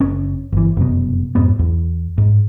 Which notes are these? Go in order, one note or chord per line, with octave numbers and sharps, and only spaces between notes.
F#1 C#4
G1 E3
F1 F#2 B2
F2 G#2 B2 B3
E2
G#2